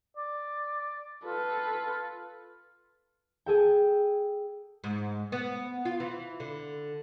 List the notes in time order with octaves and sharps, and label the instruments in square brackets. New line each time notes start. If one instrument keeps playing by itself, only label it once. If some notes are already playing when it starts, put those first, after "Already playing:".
[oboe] D5
[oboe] F4 [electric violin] A4 B4
[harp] G#4 A4 G5
[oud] G#2
B3
F4
E3
D3